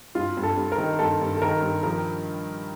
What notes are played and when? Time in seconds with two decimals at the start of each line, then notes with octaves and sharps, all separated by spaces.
0.15 G2 F4
0.37 G2
0.43 A4
0.57 G2
0.72 A#4
0.78 D#3
0.99 G2 A4
1.21 G2
1.37 A4
1.42 D#3 A#4
1.62 G2
1.83 F3 A#4